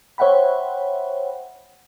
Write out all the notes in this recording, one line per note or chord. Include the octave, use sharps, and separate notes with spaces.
C5 C#5 E5 F#5 G5 B5